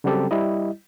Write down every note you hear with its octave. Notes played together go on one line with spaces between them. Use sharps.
C#3 F#3 G3 C4 G4 A4
G3 E4 D#5